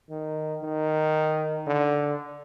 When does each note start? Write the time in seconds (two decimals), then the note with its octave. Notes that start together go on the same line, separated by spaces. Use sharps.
0.10 D#3
0.62 D#3
1.67 D3